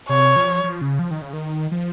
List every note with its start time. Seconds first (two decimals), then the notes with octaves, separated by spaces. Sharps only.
0.09 C3 C#5
0.36 F3
0.64 F3
0.81 C#3
0.99 F3
1.11 D#3
1.22 C#3
1.33 D#3
1.71 F3